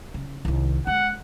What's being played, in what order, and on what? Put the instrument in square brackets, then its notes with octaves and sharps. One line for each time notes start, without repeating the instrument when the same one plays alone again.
[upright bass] C#3
C2 D#3
[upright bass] G#3 [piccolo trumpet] F#5